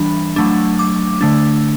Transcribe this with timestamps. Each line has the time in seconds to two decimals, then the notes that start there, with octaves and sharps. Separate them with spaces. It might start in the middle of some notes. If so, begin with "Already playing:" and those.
Already playing: E3 G3 D4 B5
0.36 F#3 A3 D4
0.79 D6
1.21 D3 A3 D4